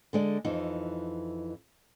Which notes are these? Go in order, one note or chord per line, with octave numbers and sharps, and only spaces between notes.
D3 G#3 D5
F2 E3 D#4